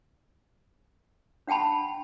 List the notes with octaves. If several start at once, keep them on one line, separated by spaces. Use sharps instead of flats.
D4 F#5 G5 A5 B5